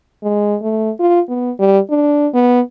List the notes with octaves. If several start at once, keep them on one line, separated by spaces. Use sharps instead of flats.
G#3
A3
F4
B3
G3
D4
B3